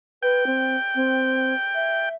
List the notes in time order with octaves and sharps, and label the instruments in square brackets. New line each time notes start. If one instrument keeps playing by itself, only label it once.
[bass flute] B4 [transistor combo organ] G5
[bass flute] C4
C4
E5